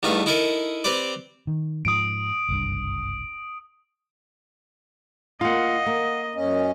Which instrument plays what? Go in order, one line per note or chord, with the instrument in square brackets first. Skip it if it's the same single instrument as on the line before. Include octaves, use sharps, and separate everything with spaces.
[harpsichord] E2 G2 A3 D#4 F5
D#4 E4 A4 A#4 D#5
C4 G4 B4 C5 D5
[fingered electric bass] D#3
[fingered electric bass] G#2 F3 [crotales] D#6 D7
[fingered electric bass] F#1 C2 G2
[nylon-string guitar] A#3 F4 [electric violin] D#5 [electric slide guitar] F5 F#5
[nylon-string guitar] A#3
[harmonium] F#2 C#4 D#5